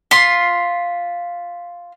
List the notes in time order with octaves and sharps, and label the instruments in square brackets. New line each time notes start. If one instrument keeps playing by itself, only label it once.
[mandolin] F4 C6 [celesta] B6